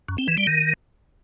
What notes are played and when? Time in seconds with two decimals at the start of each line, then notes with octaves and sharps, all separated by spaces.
0.08 F#2
0.18 C4
0.28 E3
0.38 G3
0.47 D#3